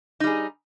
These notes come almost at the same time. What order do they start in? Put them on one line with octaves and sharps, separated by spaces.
D#4 G3 G#4